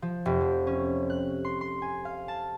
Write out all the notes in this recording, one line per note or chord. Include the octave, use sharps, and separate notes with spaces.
F3
F1
F3
C#4
F#6
C6
C6
G#5
F5
A5